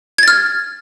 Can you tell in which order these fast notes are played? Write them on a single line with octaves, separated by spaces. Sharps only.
G#6 A6 F6